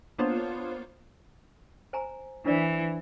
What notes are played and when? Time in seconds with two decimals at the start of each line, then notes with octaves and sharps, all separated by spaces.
0.18 A#3 B3 D4 F4 C5 C#5
1.93 C5 G#5 A#5
2.46 E3 D4 C5 D5